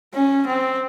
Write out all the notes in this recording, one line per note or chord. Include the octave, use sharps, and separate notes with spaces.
C#4
C4